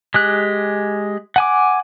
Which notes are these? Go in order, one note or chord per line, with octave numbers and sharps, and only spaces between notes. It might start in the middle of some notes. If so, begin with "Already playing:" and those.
G#3 G4 F#6
F#5 G#5 D6